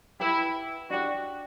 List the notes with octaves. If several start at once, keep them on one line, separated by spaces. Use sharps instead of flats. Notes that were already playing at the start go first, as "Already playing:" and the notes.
E4 G4 B4 F#5 B5
D4 F#4 G4 D5